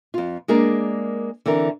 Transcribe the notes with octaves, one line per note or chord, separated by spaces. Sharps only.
F2 F4
G#3 A#3 D4 G#4 A#4 D5
D3 E3 C4 A#4